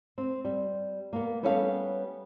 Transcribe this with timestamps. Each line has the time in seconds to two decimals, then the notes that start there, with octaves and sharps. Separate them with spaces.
0.18 C4
0.45 G3
1.13 A#3 B3
1.43 G3 B3 C#4 A4 B4 F5